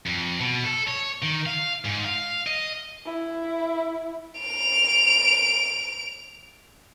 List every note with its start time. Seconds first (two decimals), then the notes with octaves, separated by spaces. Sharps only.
0.06 F2
0.40 B2
0.64 A4
0.88 C#5
1.22 D#3
1.46 F5
1.85 G#2
2.05 F5
2.47 D#5
3.06 E4
4.40 D7 F7